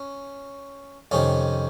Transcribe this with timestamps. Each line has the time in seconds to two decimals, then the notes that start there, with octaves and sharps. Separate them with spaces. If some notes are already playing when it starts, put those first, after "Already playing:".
Already playing: C#4
1.11 F2 C3 D#3 C#4